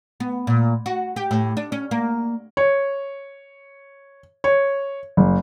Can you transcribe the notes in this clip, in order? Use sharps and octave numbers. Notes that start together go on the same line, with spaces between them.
B3
A#2
F#4
G4
A2
D4
C#4
A#3
C#5
C#5
F#1